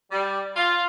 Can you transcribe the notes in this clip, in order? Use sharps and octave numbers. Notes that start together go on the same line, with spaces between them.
G3
F4